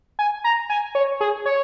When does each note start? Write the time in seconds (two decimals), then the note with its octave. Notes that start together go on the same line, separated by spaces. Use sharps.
0.19 G#5
0.44 A#5
0.70 G#5
0.95 C#5
1.21 G#4
1.46 C#5